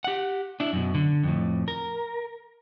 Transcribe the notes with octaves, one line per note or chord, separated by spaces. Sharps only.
G4 F#5
D4 E4
F#2 B2
D3
F2 A2
A#4